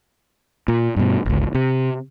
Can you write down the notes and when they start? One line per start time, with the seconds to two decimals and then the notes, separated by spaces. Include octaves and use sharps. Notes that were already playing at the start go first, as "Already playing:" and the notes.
0.68 A#2
0.96 G2 B2
1.25 G1 C#2
1.55 C3